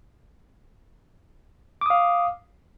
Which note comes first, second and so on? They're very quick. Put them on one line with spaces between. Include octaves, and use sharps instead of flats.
D6 D#6 F5